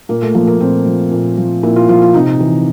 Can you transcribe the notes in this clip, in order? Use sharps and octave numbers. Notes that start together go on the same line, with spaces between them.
A#2 A#3
A3
F3 A#3
A#3
A#2 C4
F3
A#2
F3
A#2 E4
F4
F3 F4
F4
C3 D#4
E3